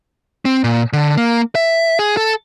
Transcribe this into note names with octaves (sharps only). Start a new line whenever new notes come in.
C4
A#2
D3
A#3
E5
G#4
A4